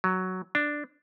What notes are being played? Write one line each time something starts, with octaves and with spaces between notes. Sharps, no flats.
F#3
D4